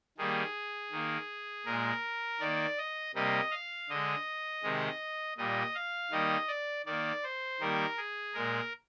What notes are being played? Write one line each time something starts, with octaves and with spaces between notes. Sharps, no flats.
D#3 G3 A#3 G#4
D#3 A#3
A#2 G#3 A#4
D#3 A#3 D5
D#5
C3 G3 A#3 D#5
F5
D3 G#3 D#5
C3 D#3 G#3
A#2 G3 A#3 D#5
F5
D#3 G3 A#3 D#5
D5
D#3 A#3 D5
C5
D#3 G3 A#3 A#4
G#4
A#2 G#3 A#4